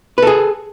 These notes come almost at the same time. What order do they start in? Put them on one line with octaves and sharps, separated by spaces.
B4 A4 G#4